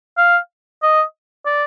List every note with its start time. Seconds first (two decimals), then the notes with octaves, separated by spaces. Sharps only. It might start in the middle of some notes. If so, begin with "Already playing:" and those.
0.18 F5
0.82 D#5
1.45 D5